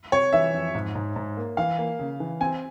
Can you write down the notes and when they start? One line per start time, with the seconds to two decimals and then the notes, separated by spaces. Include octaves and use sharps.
0.12 C3 C#5
0.33 E3 E5
0.54 F2
0.75 G#2
0.95 G#2
1.16 G#2
1.37 A#3
1.57 E3 F5
1.78 A#3
1.99 C#3
2.20 E3
2.41 C4 G#5